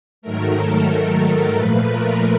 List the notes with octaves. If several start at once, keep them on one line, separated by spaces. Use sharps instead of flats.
G#2 D#3 F#3 A3 A#4
A4
A4
A#4
A#2 F3 A3 B4
A#4